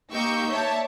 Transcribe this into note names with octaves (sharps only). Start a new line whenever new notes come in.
A#3 D#4 G4 C#6 E6 G6
C#5 D5 E5 A5